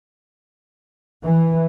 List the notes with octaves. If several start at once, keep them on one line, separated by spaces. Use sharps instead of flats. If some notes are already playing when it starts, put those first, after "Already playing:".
E3